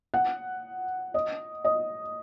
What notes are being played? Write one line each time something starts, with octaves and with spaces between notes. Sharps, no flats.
F#5
D#5
D#5